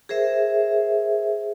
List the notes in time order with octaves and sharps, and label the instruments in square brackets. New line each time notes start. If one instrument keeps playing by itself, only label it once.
[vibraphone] G#4 A#4 C5 E5